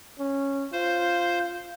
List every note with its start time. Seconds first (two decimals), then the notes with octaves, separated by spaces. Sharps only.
0.19 C#4
0.73 F4 C5